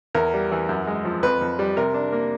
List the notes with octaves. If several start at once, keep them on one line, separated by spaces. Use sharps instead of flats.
E2 A#4
G3
E3
F#2
G#3
F3
F2 B4
F2
G3
C3 A#4
D4
A#3